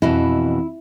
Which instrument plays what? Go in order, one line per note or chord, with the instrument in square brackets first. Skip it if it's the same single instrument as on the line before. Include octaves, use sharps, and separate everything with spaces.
[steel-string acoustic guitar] F2 B2 E3 [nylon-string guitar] E4